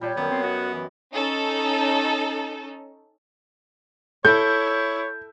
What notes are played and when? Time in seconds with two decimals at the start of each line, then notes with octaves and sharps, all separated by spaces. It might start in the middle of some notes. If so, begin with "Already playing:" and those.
0.01 A#2 G3 C#5 G5 A5
0.17 F#2 D#3 B3
0.31 C4
0.43 F#4 D#5
0.74 E3
1.14 C#4 D#4 A4
4.25 E4 A4 C#5 G6